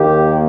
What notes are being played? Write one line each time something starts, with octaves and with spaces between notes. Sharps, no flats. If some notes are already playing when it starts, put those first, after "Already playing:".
Already playing: D#2 D#3 A#3 G4